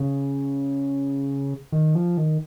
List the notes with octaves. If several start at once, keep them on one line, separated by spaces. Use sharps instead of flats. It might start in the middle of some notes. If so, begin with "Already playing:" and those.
Already playing: C#3
D#3
F3
D#3